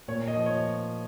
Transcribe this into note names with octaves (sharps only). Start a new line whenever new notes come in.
A#2 C#5
D#5
F3
C#5